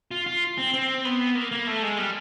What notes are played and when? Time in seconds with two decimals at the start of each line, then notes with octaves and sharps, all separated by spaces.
0.11 F4
0.26 F4
0.58 C4
0.74 C4
1.05 B3
1.35 A#3
1.52 A#3
1.67 A3
1.82 G#3
1.98 G3